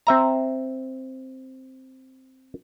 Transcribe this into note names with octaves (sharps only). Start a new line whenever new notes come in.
C4 E5 A#5